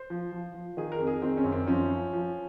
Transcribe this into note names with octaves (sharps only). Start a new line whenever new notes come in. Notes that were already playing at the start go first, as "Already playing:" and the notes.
Already playing: C5
F3
F3
F3
D#3 G#4
A#4
F2
G#4
D#3 C4
C#4
F#2
C4
F3 C#4
F3
F3